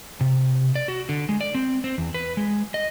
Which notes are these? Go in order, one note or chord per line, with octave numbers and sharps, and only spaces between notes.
C3
D5
F#4
D3
G#3
D5
C4
C4
E2
B4
G#3
D#5